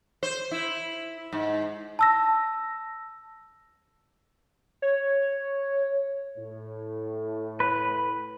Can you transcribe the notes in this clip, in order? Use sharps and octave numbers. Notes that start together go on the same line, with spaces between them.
C5
E4
G#2
A5 E6 A#6
C#5
A2
B4